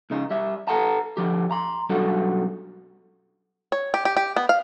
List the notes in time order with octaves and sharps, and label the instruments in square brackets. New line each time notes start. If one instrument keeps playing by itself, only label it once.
[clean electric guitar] C#2 C#3 D#4
G3 E5
A4 F#5 A5 A#5
D3 F3 G4
A#5 C6
B1 F#2 G3 D4 F#4 A4
[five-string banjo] C#5
G4
G4
G4
B3
F5